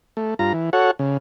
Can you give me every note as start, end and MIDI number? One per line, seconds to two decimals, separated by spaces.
0.17 0.34 57
0.39 0.53 43
0.39 0.53 65
0.39 0.53 82
0.53 0.70 52
0.73 0.91 66
0.73 0.91 69
0.73 0.91 73
0.73 0.91 78
0.99 1.17 49